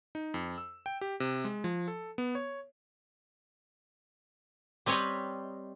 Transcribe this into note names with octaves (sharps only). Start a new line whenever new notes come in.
D#4
F2
E6
G5
G4
C3
G#3
F3
A4
B3
C#5
G3 C4 B4 C#5 D#5